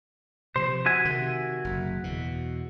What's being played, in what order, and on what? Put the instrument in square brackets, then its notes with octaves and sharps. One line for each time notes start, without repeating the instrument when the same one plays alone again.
[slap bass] C3 D#3 F3 [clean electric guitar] C5
[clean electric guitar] F#4 E5 G#5
[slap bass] C3 D#3
F#1
E2 B2